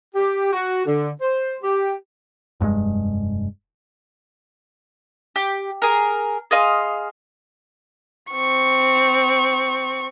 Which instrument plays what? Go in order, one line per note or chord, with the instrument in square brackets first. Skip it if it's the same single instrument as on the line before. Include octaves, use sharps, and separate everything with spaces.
[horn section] G4
F#4
D3
C5
G4
[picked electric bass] F1 G2 A#2 G#3
[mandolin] G4
G#4 A#4
G#4 D#5 F5 C6
[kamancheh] C4 C#6